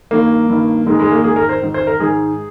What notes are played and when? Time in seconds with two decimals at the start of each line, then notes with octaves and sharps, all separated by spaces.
0.11 G2 D#3 A#3
0.49 G2 D#3
0.87 G#2 D#3 G#3
0.99 G#3
1.11 A#3
1.24 G#2 D#3 G#4
1.36 A#4
1.49 C5
1.62 G#2 D#3
1.74 C5
1.87 A#4
1.99 G#2 D#3 G#4